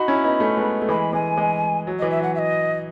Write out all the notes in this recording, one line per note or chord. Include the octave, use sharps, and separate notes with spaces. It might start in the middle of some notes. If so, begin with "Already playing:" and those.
Already playing: D#4 F#4 B5
C#4 E4
B3 D#4
A3 C#4
G#3 B3
A3
E3 G#3 B5
E3 G#3 G#5
E3 G#3
F#3
E3 D#5
E5
F#3 F#5
E5
D#5